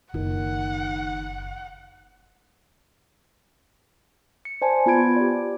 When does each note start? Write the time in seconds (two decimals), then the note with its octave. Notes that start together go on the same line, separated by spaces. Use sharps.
0.14 F#1 D#3 F#5
4.45 C#7
4.62 C5 D5 G#5 A5
4.86 B3 F4 B5 G#6 D7
5.16 G4 D5